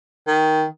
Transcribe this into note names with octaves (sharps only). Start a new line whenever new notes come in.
D#3